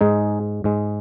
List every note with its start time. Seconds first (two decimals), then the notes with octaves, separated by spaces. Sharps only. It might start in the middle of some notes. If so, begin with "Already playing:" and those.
0.01 G#2 G#3 D#4 G#4
0.64 G#2 G#3